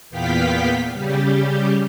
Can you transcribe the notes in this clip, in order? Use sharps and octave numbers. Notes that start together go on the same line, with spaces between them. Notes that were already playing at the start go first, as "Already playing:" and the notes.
E2 A#2 B3 F5 G5 B6
C#3 G3 G4